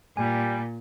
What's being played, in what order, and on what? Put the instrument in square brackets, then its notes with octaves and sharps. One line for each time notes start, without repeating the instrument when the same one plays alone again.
[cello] A#2 [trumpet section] G3 [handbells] G#5